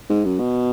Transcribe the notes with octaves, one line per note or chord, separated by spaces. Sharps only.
G#2
F#2
B2